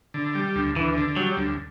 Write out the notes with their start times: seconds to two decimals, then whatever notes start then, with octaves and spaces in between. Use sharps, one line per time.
0.14 D3
0.35 G3
0.56 D2
0.75 D2 E3
0.97 D3
1.16 F#3 G3
1.37 D2